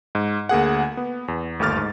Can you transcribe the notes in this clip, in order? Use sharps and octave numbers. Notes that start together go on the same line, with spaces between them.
G#2
D2 A#3 G#4 F#5
B3
E2
G1 D#2 A3 D6 F6 A6
G#2